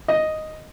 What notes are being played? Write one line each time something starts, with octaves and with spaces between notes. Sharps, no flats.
D#5